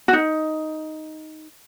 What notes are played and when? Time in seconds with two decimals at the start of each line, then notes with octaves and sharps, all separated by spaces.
0.08 F#4
0.13 D#4